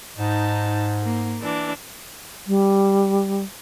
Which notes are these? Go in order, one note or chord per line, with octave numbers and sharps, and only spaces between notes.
G#2 D#4 A5
A#3
E3 D4
G3